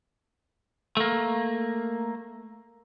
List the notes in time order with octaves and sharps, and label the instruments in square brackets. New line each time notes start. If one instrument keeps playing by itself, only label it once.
[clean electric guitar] A3 A#3